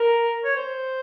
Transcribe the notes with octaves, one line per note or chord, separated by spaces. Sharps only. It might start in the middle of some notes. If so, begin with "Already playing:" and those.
Already playing: A#4
C#5
C5